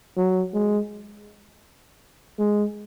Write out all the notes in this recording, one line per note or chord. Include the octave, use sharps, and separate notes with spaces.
F#3
G#3
G#3